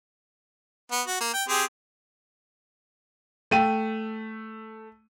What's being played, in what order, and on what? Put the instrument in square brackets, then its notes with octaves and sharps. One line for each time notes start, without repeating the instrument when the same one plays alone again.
[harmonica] B3
F#4
A#3
G5
C4 G4 G#4
[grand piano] A3 D#7 [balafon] F5 G5